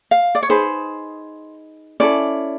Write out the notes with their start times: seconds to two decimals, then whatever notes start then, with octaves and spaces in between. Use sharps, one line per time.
0.11 F5
0.35 D5
0.43 C#5
0.49 D#4 G#4 B4 C5
2.00 C#4 E4 A4 D5